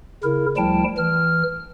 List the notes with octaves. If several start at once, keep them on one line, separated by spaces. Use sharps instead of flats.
C#3 E4 A#4
D2 F3 G3 E4 G5 A5
E3 F6